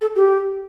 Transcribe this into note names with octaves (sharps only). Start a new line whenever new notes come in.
A4
G4